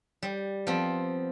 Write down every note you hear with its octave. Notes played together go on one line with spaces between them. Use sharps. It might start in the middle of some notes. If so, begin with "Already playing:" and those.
G3
F3 B3 C4